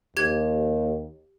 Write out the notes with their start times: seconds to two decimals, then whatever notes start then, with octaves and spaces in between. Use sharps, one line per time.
0.17 D#2 G4 G#6